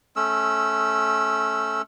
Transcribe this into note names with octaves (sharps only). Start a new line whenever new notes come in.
A3 C#4 E6